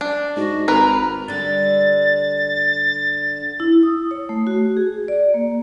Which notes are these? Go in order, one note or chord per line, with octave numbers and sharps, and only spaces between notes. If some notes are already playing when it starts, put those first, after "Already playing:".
D4
G#2 F#4
G#1 A#4 B4 A#5
D3 G3 A6
E4
D#6
C#5
A3
F#4
G#4
D5
A#3